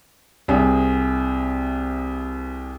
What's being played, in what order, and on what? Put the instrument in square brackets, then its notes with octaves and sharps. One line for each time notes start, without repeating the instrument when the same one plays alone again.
[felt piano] C2 C3 G#4